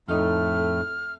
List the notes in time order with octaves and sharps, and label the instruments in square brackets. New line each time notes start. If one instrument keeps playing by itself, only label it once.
[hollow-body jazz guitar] F2 D#4 [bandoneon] A2 A3 [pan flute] A4 [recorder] F6